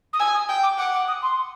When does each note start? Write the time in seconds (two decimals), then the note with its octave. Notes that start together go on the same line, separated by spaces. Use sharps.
0.13 D#6
0.19 G#5 E6
0.34 D#6
0.49 G5
0.63 D6
0.78 F#5 D6
0.93 D6
1.08 D#6
1.22 C6